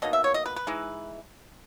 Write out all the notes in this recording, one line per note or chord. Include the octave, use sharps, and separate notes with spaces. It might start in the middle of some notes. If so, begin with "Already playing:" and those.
B2 A#3 D#4 D#5
E5
C#5
D#5
B4
B4
E3 G#3 D#4